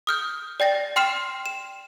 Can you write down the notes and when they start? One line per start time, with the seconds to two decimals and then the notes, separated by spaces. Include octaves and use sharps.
0.07 D#6 F6 G6
0.60 D5 G5 A6 A#6
0.96 G5 C6 F6 C7 E7
1.46 E7